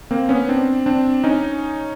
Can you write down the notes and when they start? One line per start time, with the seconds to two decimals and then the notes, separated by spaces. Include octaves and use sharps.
0.11 A#3 C4
0.29 B3 C#4
0.49 C4 D4
0.86 C4 D4
1.24 C#4 D#4